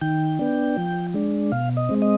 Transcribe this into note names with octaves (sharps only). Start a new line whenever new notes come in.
D#3 G5
B3 D4
F3
G#3 D4
B2 F5
D#5
G#3 C4
D#5